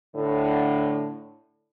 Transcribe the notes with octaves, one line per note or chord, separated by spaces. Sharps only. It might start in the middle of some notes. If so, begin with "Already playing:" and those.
A2 D3